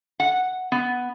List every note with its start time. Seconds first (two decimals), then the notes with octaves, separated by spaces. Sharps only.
0.20 F#5
0.72 B3